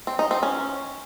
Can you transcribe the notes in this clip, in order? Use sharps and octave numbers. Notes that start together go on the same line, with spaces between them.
C4
D#4
C4
C#4